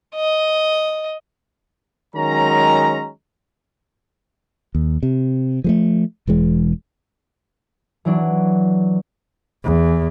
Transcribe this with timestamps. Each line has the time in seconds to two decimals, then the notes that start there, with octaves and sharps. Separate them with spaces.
0.15 D#5
2.15 D#3 F#3 G#3 C#4 A#5
4.75 D#2
5.03 C3
5.64 F3 G#3 A3
6.27 E1 E3 G#3
8.05 E3 F#3 D4
9.64 E2